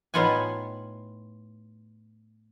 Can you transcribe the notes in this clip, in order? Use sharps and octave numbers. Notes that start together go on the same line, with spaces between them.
A2 B3 D#4 F4 F#5 G#5